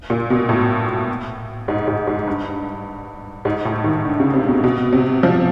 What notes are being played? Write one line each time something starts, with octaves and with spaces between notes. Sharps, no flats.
A#2
B2
A2
G#2
G#2
G#2
G2
G#2
A2
D#3
D3
C#3
C3
B2
B2
C3
F3